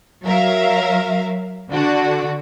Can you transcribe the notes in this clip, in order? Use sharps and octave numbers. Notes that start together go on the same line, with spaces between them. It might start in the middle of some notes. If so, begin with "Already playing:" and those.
F#3 A#4 E5 F5
D3 D4 F#4